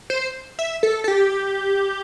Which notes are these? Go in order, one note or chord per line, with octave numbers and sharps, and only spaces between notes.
C5
E5
A4
A4
G4